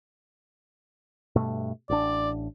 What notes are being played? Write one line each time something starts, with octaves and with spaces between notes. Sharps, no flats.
G2 B2 A3
A1 D4 D5